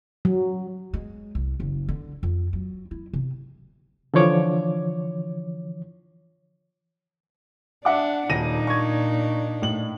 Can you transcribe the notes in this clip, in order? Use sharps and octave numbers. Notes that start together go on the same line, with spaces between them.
F#3
G#3
C2
F#1
D3
F2
F#3
E4
C3
D3 E3 F3 C#5 D6
D4 E5 F#5 D6
D#1 A#2 D4 D#4 A#6 D#7
C#6 G#6
A2 F#7